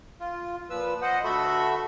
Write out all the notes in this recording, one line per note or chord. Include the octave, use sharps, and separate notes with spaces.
F4
A#2 F3 B4 E6
C5 D#5 F#5
D2 A3 F#4 A4 E5 B5